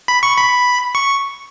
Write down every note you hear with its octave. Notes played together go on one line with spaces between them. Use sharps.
B5
C#6
B5
C#6